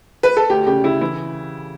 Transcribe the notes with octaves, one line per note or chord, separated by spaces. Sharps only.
B4
A4
D2 G4
C#3 G4
C#3 E4
E3 E4